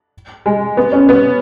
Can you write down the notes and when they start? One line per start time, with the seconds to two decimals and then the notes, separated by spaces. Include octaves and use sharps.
0.46 G#3
0.77 B3
0.92 C#4
1.09 B3